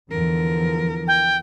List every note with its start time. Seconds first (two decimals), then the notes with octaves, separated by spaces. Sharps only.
0.10 E2 D3 E3 F3 A#4
1.08 G5